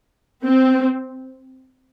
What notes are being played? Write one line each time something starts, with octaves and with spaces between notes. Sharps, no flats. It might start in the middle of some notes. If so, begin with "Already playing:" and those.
C4